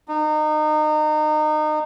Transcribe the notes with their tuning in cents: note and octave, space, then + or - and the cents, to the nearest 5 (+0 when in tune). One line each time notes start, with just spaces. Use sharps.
D#4 -30